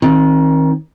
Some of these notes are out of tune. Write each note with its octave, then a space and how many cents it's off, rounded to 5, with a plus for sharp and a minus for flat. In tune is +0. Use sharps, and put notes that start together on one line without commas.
D#3 +25 C4 +40